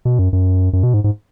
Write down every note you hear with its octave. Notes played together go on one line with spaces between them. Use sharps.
B2
F#2
F#2
F#2
B2
G#2
G#2